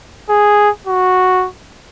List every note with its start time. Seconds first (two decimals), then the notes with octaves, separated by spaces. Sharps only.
0.29 G#4
0.87 F#4